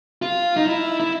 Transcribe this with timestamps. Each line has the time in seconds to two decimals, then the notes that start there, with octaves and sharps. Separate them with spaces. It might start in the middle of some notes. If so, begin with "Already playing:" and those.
0.22 F4
0.57 D#4
0.67 E4
1.00 E4